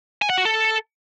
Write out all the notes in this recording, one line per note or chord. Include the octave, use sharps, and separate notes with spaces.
G#5
F#5
F#4
A4